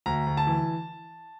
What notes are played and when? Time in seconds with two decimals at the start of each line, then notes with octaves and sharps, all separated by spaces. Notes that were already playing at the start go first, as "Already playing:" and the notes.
0.06 D2 A#5
0.26 D2
0.37 A5
0.47 E3